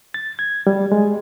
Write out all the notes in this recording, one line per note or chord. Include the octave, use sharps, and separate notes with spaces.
A6
G#6
G3
G#3